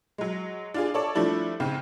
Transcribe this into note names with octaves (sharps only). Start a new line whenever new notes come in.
F#3 G#3
D4 F4 G#4
A4 C#5 D5 A5
F3 G3 A3 D4 E4
G#2 C#3 C4